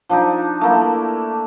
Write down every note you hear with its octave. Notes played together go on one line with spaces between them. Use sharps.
F3 D4 D#4
A3 A#3 E4